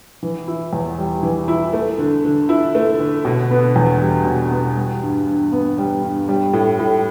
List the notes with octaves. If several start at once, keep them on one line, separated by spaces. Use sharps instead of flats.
E3
E4
E2
G3
E3
E4
A3
D3
D3
E4
A3
D3
B2
B3
E2
G3
B2
B3
G3
G2
G2
B3
G3
G2
G3
A2
A2